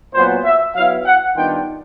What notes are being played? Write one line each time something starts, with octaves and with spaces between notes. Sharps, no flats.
A#2 F#3 B3 C5
E5
F#3 B3 E4 F5
F#5
D#3 G3 B3 D4 F4 G5